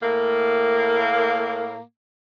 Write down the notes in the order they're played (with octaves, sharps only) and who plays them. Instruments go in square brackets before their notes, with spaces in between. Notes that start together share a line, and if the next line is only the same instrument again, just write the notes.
[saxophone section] A2 A#3